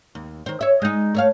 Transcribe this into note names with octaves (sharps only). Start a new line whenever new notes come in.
D#2
D#3 C5
C#5 E5
G#3 D#4
A3 C#5 F5